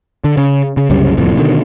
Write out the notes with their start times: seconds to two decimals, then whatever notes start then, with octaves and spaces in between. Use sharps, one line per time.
0.24 D3
0.37 C#3
0.77 C#3
0.90 C2 F#2 C#3 G3
1.17 D1 C2 F2 A2
1.37 B2 D3 D#3